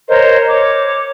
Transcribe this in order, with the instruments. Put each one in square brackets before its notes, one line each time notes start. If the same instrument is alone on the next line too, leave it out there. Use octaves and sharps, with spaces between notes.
[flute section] A#4 C5 C#5 D#5
C#5 D6